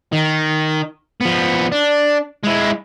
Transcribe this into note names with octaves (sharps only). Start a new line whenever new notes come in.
D#3
F3 B3
D4
G#3 E4